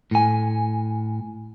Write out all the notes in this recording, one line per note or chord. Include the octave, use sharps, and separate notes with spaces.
A2 G#5